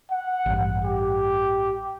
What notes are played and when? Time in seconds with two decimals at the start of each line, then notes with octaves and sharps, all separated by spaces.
0.11 F#5
0.46 A1 G2
0.85 G4